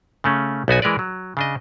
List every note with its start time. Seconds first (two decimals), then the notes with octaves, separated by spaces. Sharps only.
0.24 C#3 A3 C#4
0.68 B1 B3 F#4 G#5
0.82 E3 G#3 A#4 B4 D5
0.99 F#3
1.37 C#3 D4 D#5